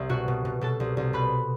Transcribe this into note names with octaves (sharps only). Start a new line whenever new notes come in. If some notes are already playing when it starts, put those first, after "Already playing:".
Already playing: C2 E5
B2 F#4 F#5
B2
B2
B2 A4 A5
C2
C2
B2 B4 B5